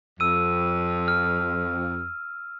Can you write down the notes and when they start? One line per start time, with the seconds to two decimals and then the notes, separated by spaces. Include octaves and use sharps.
0.20 F2 E6 D#7
1.08 F6